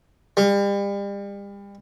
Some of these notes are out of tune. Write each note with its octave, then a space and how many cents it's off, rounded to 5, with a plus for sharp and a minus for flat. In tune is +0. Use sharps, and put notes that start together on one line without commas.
G3 +35